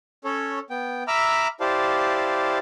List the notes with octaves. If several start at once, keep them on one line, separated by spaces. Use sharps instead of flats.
C#4 A4 C#5
B3 G5
E5 A#5 B5 D6 E6 F6
E4 G4 C5 D5 F5 A5